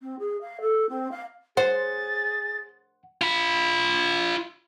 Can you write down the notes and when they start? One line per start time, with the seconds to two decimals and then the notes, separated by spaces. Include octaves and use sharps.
0.01 C4
0.19 G#4
0.41 F5
0.61 A4
0.89 C4
1.11 F5
1.57 G#4 C5 F#5 A6
3.22 F4 B5